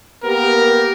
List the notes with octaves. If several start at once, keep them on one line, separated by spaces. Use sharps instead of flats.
A#3 B3 G4 A#4